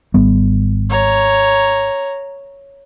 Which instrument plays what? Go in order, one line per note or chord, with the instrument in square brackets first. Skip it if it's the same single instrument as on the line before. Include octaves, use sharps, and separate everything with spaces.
[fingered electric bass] G#1 G3 B3
[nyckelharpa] C#5 A#5